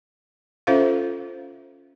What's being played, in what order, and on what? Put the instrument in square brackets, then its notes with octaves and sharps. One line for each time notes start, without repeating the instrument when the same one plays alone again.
[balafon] C#4 F4 A4 C5 E5 F5